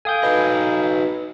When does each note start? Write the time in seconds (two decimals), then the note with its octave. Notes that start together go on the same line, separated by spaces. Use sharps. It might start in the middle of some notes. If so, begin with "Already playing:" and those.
0.05 A4 F5 G5 G#5 D#6 G6
0.23 D#4 F#4 B4 D#5